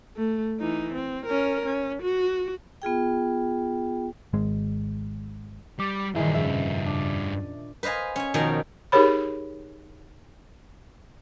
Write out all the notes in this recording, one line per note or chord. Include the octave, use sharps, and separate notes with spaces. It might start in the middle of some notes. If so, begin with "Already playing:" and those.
A3
E3 D#4
C4
C#4 A#4
C#4
F#4
B3 F4 G#4 G5
G#1 G#3
G3 D6
G2 A#2 D#3 E3 E4 G#4
F2 C#3 E5
D4
B4 C5 D#5 F5 G#5
C#4 G#5
B2 D#3 F3 F5 G#5 A#5
D#4 G4 G#4 A#4 C#5 B5